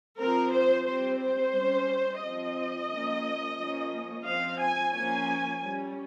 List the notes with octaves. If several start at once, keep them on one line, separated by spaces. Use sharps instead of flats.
F3 C4 A#4
C5
G3 C4 C5
C5
G3 C#4
F3 C4 D#5
F3 A#3 C#4
F3 A#3 C#4
F3 C4 F5
G#5
F3 A#3 C#4 G#5
G3 C#4